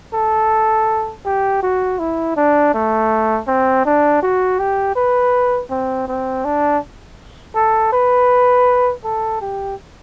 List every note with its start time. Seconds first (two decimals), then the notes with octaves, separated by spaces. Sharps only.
0.14 A4
1.25 G4
1.63 F#4
1.99 E4
2.37 D4
2.74 A3
3.47 C4
3.85 D4
4.23 F#4
4.59 G4
4.96 B4
5.70 C4
6.08 C4
6.45 D4
7.55 A4
7.93 B4
9.04 A4
9.42 G4